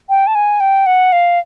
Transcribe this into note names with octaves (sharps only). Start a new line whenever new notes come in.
G5
A5
G#5
G5
F#5
F5